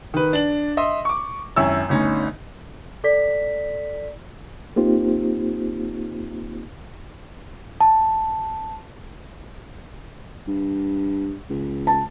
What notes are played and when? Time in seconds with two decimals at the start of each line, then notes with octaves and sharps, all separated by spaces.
0.14 D#3 B4
0.33 D4 F#7
0.77 D#5 E5 C6
1.05 C#6 D6
1.56 G#1 F#2 E4 C#5 E6
1.89 G1 D2 C#4 D#4
3.04 A4 D5 B6
4.76 A#3 C4 D#4 F4 G4 C5
7.81 A5
10.47 G2
11.50 C#2
11.87 A5